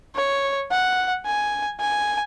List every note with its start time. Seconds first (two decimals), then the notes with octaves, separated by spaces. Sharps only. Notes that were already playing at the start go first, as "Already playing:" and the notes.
0.16 C#5
0.71 F#5
1.26 G#5
1.80 G#5